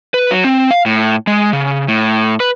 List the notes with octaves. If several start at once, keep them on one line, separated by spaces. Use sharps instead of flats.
B4
F#3
C4
F5
A2
G#3
C#3
A2
B4